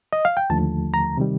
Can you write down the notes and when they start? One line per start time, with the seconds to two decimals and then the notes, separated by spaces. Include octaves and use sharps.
0.13 D#5
0.25 F5
0.37 G5
0.50 D#2 D3 F3 A3 A5
0.94 A#5
1.17 C3 D#3 G3